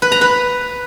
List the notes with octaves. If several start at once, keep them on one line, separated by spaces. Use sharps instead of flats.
B4
A#5
B4